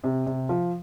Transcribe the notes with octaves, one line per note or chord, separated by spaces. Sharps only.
C3
C3
F3